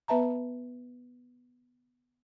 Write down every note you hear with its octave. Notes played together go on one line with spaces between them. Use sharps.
B3 B4 E5 A5 A#5